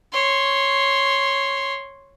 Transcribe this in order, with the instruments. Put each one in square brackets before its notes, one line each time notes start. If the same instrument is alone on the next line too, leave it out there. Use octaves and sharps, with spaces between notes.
[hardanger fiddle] C#5 C6